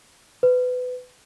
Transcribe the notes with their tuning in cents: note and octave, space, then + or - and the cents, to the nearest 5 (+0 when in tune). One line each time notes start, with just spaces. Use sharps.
B4 +25